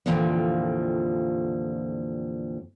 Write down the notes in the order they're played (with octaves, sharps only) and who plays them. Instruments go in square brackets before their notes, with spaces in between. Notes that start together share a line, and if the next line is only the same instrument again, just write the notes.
[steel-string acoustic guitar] F2 A#2 D3 E3 F3 G3